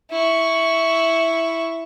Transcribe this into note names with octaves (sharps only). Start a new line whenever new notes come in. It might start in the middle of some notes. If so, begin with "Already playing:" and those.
E4 C#6